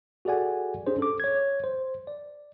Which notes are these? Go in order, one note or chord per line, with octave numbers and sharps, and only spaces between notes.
F#4 G#4 A4 D5 F#5 G#5
C#4 D4 G4 G#4 C5
A4 D6
C#5 G#6
C5
D5